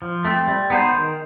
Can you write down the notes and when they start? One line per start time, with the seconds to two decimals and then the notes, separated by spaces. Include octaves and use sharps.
0.02 F3
0.25 A3 C4
0.47 G3
0.70 B3 D#4 G#4 C5
0.93 D#3